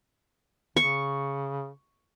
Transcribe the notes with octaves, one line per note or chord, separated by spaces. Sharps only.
C#3 C#6